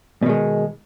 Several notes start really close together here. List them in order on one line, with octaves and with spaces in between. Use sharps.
B2 D#3 G#3